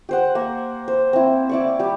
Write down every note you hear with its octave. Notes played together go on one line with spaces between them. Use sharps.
G4 C5 F#5
A#3
C5
C4 E4
E4 D5 C#6
G3 G4